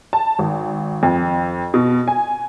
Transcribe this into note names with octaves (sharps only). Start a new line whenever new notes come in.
A5
G#1
F2
B2
G#5